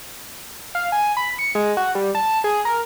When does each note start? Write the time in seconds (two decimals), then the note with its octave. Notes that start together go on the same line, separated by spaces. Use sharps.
0.75 F5
0.92 G#5
1.17 B5
1.39 C#7
1.55 G#3
1.77 F#4
1.95 G3
2.15 A5
2.44 G#4
2.65 A#4